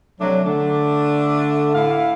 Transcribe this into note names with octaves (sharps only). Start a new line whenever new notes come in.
C3 F#3 A3 D4
D3 A3 D4
A2 E4 F5